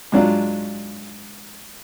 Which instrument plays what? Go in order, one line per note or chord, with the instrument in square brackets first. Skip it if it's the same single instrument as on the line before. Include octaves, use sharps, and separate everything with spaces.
[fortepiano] G#2 F#3 D4 F4